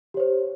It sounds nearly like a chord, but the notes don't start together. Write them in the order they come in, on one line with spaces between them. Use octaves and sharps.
G4 C#5 C5